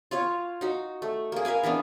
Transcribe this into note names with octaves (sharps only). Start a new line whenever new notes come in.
F4 C#5 F5
D#4 F#4
A3
A#3 G#4
A#4 B4 F5 G#5
E3 A#3 B3 D4